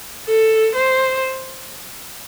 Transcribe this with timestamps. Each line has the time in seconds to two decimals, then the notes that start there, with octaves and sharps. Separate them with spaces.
0.25 A4
0.75 C5